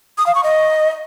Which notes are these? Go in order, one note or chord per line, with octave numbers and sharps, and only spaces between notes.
D#6
F5
C#6
D#5